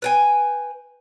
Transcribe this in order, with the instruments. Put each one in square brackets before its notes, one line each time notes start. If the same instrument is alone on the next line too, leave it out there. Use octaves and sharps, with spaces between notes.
[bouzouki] B4 G5 G#5